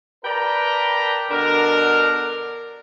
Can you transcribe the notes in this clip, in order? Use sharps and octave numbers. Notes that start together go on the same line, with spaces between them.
A#4 B4 D5 G5 A5 A#5
B2 D3 D4 A#4